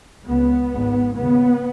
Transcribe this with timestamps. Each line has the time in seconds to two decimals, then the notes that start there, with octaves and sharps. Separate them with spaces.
0.27 C#2 C#3 B3
0.73 G#1 G#2
1.18 D#2 C#3 B3